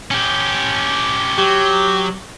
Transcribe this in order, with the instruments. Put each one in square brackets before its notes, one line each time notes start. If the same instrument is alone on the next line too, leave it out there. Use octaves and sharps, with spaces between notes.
[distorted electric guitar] C#4 G4
[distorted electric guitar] F#3 [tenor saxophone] G4